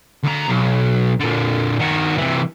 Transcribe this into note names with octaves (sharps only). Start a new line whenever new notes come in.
D2 A#5
B1
A#2 D3
D#3 F#4
C3 E3